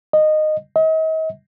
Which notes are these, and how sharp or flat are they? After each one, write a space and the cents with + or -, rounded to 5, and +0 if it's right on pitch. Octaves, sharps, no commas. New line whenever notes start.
D#5 -15
D#5 +40